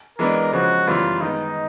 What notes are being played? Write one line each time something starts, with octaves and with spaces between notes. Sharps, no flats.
E3 G#3 B3 D4 A#4
C#3 F3 G#3 F#4
F#2 C#3 E3 G3 B3 F4
D#3 G#3 B3 D#4